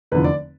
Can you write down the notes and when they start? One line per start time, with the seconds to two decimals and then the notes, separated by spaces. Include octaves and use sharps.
0.12 F1 E2 D3 F3 B4
0.24 D5